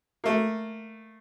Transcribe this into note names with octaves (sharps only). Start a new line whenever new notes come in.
A3 A#3